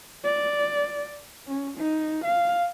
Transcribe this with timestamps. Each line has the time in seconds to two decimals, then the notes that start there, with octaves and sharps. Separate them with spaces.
0.24 D5
1.47 C#4
1.77 D#4
2.25 F5